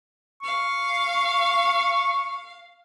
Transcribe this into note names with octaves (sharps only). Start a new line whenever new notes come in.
F5 C#6